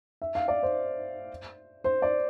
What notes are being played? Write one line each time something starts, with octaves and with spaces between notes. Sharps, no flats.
E5
F5
D5
C5
C5
D5